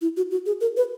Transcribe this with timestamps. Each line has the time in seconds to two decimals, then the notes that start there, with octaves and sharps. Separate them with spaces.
0.01 E4
0.17 F#4
0.31 F#4
0.46 G#4
0.61 A#4
0.77 B4